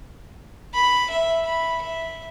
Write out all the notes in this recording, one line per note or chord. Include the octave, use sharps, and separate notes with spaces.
B5
E5
B5
E5